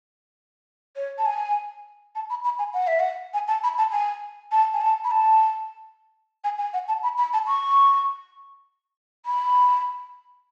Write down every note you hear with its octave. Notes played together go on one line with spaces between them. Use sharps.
C#5
A5
G#5
A5
B5
B5
G#5
F#5
E5
F#5
G#5
A5
B5
A5
G#5
A5
G#5
A5
B5
A5
G#5
G#5
F#5
A5
B5
B5
A5
C#6
B5